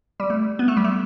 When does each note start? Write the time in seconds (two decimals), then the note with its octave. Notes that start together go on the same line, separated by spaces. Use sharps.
0.20 G3
0.30 A3
0.59 B3
0.68 A3
0.77 G3
0.84 A3